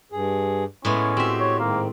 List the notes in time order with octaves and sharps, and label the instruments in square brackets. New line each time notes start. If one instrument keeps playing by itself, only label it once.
[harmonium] G2 G#4
[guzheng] A2 G#3 B3 [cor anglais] C#4 [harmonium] E4
[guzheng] C4 E5 [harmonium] F#4 G4
[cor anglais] C#5
[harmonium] G#2 D#3 [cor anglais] A#3